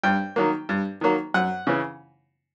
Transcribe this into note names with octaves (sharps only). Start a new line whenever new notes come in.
G2 G5
D#3 F#3 A#3
G2
D#3 F#3 A#3
F#2 F#5
C#3 E3